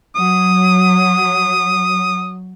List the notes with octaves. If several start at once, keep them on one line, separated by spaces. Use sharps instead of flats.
F#3 D#6